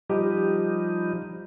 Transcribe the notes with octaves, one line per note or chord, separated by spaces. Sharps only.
F3 G3 D#4 G4